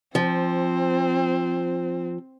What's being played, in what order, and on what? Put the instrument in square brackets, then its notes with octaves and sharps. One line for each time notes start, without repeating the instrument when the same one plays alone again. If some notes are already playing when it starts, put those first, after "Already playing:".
[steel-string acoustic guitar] F3 [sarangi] C4